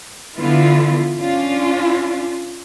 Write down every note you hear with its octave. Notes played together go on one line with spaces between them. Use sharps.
D3 E3 B3 E4 F4
C#4 D4 F4